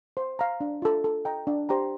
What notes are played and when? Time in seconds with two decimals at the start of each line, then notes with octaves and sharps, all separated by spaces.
0.17 C5
0.39 F5 A#5
0.60 D4
0.82 F4 A4
1.04 A4
1.25 D#5 G5 A#5
1.47 D4
1.69 G4 C5 G5 A#5